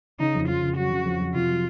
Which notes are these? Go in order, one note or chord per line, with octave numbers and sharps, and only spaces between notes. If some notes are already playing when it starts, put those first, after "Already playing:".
C#3 D#4
F2
F2 F4
C#3
F#3 F#4
C#3
F2
F2
C3 F4
F#3